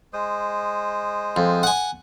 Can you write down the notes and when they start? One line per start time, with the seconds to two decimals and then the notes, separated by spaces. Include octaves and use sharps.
0.13 G#3 C5 D#6
1.36 F2
1.63 F#5 G#5